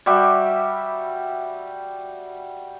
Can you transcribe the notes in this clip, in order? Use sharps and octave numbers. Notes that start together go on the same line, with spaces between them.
G3 F#4 G4 E5